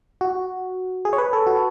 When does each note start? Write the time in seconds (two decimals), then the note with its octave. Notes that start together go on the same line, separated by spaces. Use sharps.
0.21 F#4
1.05 G#4
1.13 C#5
1.18 B4
1.33 A4
1.47 F#4